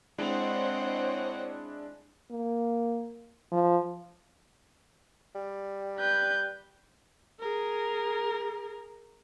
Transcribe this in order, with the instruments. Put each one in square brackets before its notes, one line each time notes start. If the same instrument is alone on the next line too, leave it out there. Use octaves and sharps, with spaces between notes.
[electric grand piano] G#3 D4 E4 [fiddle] C4 F#5 [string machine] C5 C#5 D#5
[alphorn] A#3
F3
[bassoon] G3
[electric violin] B4 G6
[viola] G#4 A#4